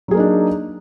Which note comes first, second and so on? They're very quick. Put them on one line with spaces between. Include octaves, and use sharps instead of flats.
F#3 G#4 A#3 D#4 D4